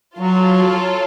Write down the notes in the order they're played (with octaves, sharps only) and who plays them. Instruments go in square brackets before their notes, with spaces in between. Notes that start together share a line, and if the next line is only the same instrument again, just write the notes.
[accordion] F#3 [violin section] F4 A4 C#5